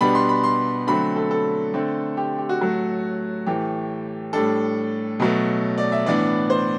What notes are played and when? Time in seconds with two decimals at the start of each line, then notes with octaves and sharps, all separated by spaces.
0.01 B2 G3 B3 D4 B5
0.15 C6
0.29 B5
0.44 C6
0.87 D3 F#3 A3 C4 B5
1.16 A4
1.31 A4
1.74 D3 A3 C4
2.17 G4
2.38 G4
2.49 F#4
2.60 A2 F#3 A3
3.46 A2 E3 A3 G4
4.33 A2 G3 D4 A4
5.20 B2 F#3 A3
5.78 D5
5.92 E5
6.06 A2 E3 B3 D4 D5
6.50 C5